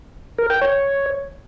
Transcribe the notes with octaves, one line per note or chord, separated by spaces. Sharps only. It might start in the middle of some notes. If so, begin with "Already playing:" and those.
A#4
G5
C#5